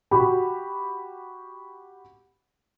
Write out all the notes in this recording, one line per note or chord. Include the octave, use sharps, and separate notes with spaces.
F#4 G4 B5